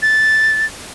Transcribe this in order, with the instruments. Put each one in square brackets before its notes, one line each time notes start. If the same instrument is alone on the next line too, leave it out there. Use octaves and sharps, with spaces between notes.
[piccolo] A6